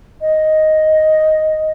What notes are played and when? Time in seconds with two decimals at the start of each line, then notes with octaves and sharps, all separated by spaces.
0.21 D#5